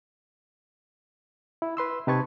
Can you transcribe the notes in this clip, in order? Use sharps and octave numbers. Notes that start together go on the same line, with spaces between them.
E4
B4 C6 E6
C3 D#4 B4 A5 C#6 G#6